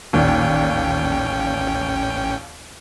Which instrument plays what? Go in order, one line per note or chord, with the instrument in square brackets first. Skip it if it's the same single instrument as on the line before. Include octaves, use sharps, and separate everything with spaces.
[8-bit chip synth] A1 C#4 G5 [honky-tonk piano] D#2 A#2